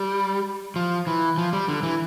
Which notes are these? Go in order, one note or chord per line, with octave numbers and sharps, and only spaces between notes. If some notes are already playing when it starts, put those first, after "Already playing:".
Already playing: G3
F3
E3
F3
G3
D3
E3